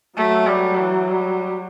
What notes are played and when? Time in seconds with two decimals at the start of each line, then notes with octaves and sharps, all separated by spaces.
0.17 F#3 A3
0.47 G3
0.78 E3
1.09 G3